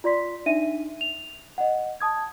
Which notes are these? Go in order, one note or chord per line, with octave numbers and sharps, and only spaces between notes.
F4 D5 C6 B6
D4 D#4 E5 D#7
F7
D#5 F#5
A5 D#6 G#6